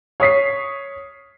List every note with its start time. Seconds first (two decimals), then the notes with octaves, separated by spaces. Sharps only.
0.20 C#5 D#6 B6 C7